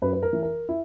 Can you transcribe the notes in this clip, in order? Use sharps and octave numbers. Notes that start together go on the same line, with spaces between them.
F#2 B4
B4
A#4
E3
A#4
E4